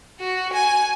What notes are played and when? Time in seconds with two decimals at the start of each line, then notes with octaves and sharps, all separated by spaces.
0.20 F#4
0.53 G#5